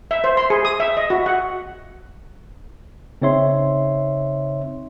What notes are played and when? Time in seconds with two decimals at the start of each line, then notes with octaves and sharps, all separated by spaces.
0.11 E5
0.24 C5
0.37 C6
0.50 G#4
0.65 D#6
0.80 E5
0.97 D#5
1.10 F#4
1.26 F#5
3.22 C#3 C4 D#4 C#5 E5 C6